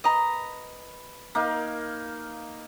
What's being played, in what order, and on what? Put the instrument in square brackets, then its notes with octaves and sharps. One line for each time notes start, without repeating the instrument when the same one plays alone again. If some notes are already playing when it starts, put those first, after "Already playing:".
[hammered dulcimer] B4 [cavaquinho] D#5 A#5
[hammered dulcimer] A#3 D#4 F5